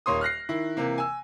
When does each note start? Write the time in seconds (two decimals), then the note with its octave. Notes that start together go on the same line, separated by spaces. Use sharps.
0.06 D#1 A#3 C#5 C6 D#6
0.21 F6 F#6 A#6 C7
0.49 D#3 E4
0.77 C3 E3 A#3
0.98 G#5 E6